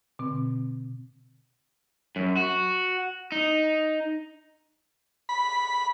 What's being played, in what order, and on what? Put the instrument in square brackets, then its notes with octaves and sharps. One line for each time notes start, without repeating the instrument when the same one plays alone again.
[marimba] B2 D3 C4
[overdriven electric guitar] F#2
F#4
D#4
[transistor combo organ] B5